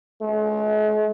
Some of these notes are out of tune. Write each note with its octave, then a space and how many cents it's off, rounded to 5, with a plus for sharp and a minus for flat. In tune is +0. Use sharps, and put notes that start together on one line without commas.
G#3 +45